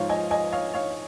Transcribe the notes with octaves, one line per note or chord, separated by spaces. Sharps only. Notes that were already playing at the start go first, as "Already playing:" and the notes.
Already playing: G#2 F3 C#5 F5
D#5 G#5
D#5 G#5
C#5 F5
C#5 F5